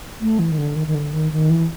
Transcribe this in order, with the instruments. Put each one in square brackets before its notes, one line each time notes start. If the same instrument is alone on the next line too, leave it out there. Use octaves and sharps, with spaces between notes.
[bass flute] A3
E3
D#3
D3
D#3
D#3
D3
D#3
D#3
E3